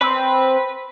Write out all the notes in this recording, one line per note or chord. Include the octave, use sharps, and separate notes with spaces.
C4 B4